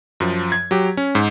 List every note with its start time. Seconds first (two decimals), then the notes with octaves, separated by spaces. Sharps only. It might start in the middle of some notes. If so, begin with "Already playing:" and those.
0.20 F#2 F3
0.52 G#6
0.71 F#3 G4
0.97 C#4
1.15 G#2